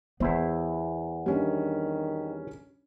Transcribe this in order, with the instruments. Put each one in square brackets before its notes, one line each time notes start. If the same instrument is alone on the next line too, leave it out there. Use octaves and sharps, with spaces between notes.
[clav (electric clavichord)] E2 E4 C5 [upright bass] B3
[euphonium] D#3 [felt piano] G3 C#4 D4